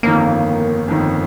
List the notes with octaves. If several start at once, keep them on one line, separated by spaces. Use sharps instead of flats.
G1 F2 D#3 A#3
G1 F2 D#3